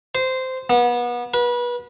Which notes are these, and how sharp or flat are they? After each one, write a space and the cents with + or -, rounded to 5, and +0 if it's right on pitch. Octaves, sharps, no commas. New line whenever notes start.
C5 -15
B3 -30
B4 -30